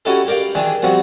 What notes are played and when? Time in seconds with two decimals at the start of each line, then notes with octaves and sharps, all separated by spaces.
0.05 C#4 D#4 E4 F#4 G4 A4
0.27 G4 A#4 D5 F5 G5
0.55 D#3 E3 D4 G#4
0.82 F3 G3 B3 C4 F#4